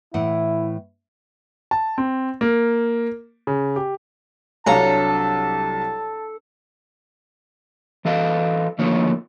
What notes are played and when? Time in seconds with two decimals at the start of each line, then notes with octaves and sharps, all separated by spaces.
0.14 A2 E3 E4 F#5
1.71 A5
1.98 C4
2.41 A#3
3.47 C#3
3.76 G4
4.66 C2 F#3 D4 A4 C#5 F5 A5 A#5
8.05 E3 A4 D#5 F5
8.78 D2 D#3 F3 A#3 C#5